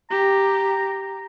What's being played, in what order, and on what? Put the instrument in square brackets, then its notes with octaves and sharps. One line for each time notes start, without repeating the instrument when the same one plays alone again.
[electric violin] G4 [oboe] A#5